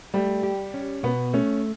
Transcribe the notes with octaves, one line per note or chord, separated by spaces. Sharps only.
G3 A3
G4
C#4
B2 B3
A3 C#4